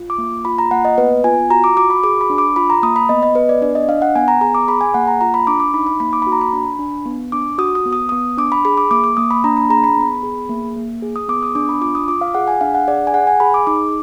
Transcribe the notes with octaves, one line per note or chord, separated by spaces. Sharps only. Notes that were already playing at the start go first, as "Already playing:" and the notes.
Already playing: F4
D6
A#3
F4 B5
A#5
A#3 F#5
D#5
B3 B4
F4 G#5
F#4 A#5
D6
F#4 D6
B5
G#4 D6
B5
D4
D6
F4 B5
A#5
A#3 D#6
B5
B3 D#5
D#5
B3 B4
D5
D4 D5
D#5
D4 F5
F#5
B3 G#5
A#5
G#4 A#5
D6
G#4 B5
G#5
A#3 F#5
A#5
F4 A#5
B5
D4 D6
D6
D#4 B5
B5
A#3 B5
D6
B5
F#4
A#5
B5
D4
D4
B3
D4 D6
F#4 D#6
D#6
B3
D#6
B3 D#6
D4 D6
B5
G#4 B5
D6
A#3 D6
D6
A#3 D#6
B5
D4 A#5
B5
G#4 A#5
B5
B3
G#4
A#3
A#3
G#4
D#6
B3 D6
D#6
D4 D6
B5
F4 D6
D#6
F4 D6
F5
G#4 F#5
G#5
D4 F5
F#5
G#4 D5
G#5
G#4 F#5
G#5
G#4 B5
D6
D#4 D6